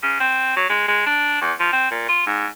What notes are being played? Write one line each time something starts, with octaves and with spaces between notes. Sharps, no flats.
C#3
C4
F#3
G#3
G#3
D4
E2
F3
C4
A#2
F4
G#2